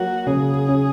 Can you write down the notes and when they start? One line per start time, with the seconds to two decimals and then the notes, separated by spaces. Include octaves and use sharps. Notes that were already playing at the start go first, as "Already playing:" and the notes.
Already playing: F#3 A#3 F#4
0.27 C#3 G#4
0.68 C#4